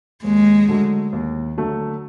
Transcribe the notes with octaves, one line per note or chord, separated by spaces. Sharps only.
D#2 G#3
D3 F#3 A3
D#2
D3 F#3 A3